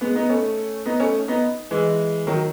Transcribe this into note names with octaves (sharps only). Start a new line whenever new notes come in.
G#3 B3
B3 D#4
A3 C#4
B3 D#4
A3 C#4
B3 D#4
E3 G#3
D#3 F#3